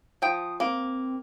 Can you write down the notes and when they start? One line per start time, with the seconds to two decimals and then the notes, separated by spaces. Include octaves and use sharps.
0.22 F3 G5 D#6
0.60 A#3 C4